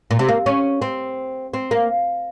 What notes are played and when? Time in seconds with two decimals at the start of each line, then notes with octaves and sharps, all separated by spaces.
0.11 A#2
0.19 C3
0.29 A#3
0.46 C#4
0.82 C4
1.54 C4
1.71 A#3